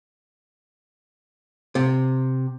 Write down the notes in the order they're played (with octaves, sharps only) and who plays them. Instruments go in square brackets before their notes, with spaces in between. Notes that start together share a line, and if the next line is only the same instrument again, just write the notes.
[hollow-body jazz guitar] C3